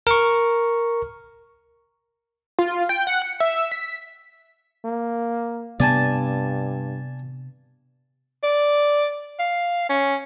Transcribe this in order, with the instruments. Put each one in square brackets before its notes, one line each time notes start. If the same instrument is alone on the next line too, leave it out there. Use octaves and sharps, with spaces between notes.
[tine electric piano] A#4 C#6
[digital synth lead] F4
G5
F#5
C#7
E5
B6
[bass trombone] A#3
[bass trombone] G2 [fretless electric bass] C3 B3 [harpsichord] D5 G#5 A5
[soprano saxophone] D5
F5
C#4